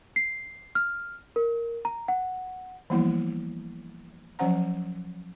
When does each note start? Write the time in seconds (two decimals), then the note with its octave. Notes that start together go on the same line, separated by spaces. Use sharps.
0.16 C7
0.75 F6
1.36 A#4
1.85 A#5
2.08 F#5
2.90 E3 F3 G3 A#3 B3 E4
4.39 F3 F#3 C#4 C5 F#5 A#5